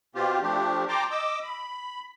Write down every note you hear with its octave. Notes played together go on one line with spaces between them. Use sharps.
B2 C4 F4 G4
F3 A3 D4 G4
G5 A5 A#5 C6 D6
D#5 D6 E6
B5